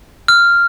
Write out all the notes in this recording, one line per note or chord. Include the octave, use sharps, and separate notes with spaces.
F6